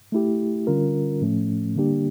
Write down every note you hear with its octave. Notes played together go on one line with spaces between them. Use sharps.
A3 E4 G4
D3 G3 C#4 F4 A#4
A2 F3 A3 C#4
D3 G3 A#3 D4 G4